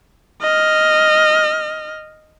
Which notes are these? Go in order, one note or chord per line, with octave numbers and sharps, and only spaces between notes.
D#5 F6